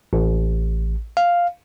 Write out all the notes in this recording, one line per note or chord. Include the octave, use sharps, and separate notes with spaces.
A1
F5